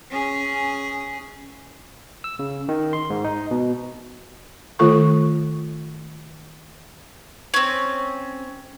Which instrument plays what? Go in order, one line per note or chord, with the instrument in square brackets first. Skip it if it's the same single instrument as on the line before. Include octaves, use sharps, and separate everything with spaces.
[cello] C#4 G#4
[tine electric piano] E6
C#3
D#3
C6
G#2
D#4
B2
[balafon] D#3 A3 F4 A4 C#6
[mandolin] C4 C#4